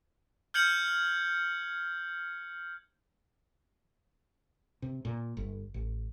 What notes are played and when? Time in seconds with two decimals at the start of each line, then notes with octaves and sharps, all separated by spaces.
0.54 F6 G6 G#6 C#7 F#7
4.82 C3
5.05 A#2
5.37 G1
5.74 A1